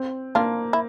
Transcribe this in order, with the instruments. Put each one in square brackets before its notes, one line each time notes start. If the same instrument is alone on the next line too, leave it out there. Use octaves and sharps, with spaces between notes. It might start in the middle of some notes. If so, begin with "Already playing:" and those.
Already playing: [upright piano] C4
[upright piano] A#3 [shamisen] D4 F4
[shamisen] E4